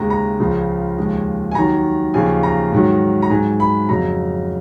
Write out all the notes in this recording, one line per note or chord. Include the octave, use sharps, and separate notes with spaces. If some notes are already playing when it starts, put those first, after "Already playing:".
Already playing: D#2 C#3 G#3 A#5
A#5
C#2 C#3 F3 G#3
D#2 C#3 F3 G#3
G#5
D#2 D#3 F#3 A#5
D#2 C#3 F3 G#5
A#5
G#2 D#3 F#3
A#5
G#2 F#3 G#5
B5
F2 C#3 F#3 A#5